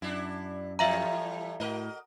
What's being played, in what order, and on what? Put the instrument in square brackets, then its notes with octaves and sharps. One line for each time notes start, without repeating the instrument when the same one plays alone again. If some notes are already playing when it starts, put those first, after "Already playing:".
[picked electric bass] F#2 [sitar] D4 E4
[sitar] A2 E3 G3 [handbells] E5 F5 A#5
[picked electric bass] A2 [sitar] F#4 A#4 D#5